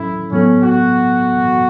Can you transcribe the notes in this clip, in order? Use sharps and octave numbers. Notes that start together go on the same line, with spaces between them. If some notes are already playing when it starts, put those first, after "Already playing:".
Already playing: A2 F#3 C#4 E4 A4
A2 F#3 B3 C#4 A4
F#4